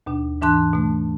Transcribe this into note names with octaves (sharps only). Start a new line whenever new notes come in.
D#2 B2 D4
G#2 E3 D4 A5 C6 F#6
B2 A3